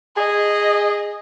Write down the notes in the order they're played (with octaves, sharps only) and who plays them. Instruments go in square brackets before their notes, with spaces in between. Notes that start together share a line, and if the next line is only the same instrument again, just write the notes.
[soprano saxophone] G#4 [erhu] D#5